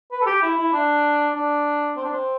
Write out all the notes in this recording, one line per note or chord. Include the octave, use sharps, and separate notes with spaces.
B4
A4
G4
E4
E4
D4
D4
C4
D4
C4